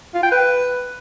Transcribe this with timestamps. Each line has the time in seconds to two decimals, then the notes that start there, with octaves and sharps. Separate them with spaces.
0.14 F4
0.23 G5
0.32 B4